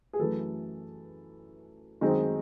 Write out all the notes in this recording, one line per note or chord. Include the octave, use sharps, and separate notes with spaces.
G#4
F#2 E3 A3 A4
F#2 D#3 G#3 C4 D#4